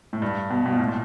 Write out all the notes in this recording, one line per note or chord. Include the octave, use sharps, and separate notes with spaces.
A2
G2
B2
B2
A#2
A2
A#2